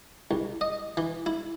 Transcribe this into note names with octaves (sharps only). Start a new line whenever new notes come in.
C2
D#5
E3
E4